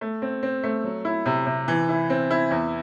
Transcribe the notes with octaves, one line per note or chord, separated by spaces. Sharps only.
A3
C4
C4
A3
F#3
E4
C3
C3
E3
E4
C4
E4
E2